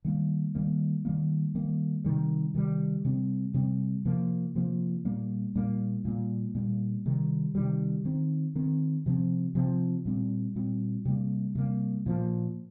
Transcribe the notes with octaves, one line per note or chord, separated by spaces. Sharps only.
D#3 G3 A#3
D#3 G3 A#3
D#3 G3 A#3
D#3 G3 A#3
C3 D#3 G3
C3 D#3 G3
C3 G3 C4
C3 G3 C4
C3 F3 A#3
C3 F3 A#3
A#2 G3 A#3
A#2 G3 A#3
A#2 G3 A#3
A#2 G3 A#3
C3 D#3 G3
C3 D#3 G3
D#3 C4
D#3 C4
C3 F3 C4
C3 F3 C4
A#2 G3 C4
A#2 G3 C4
C3 G3 A#3
C3 G3 A#3
A#2 F3 A#3